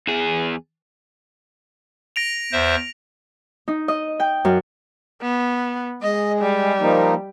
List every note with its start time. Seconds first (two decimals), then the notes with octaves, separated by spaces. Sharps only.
0.08 E2 G#4
2.16 A#6 D7 F7
2.52 E2 C5 E5
3.68 D#4
3.88 D#5
4.20 G5
4.45 F#2
5.22 B3
6.02 G#3 D#5
6.41 G3
6.80 F3 A#3 D#4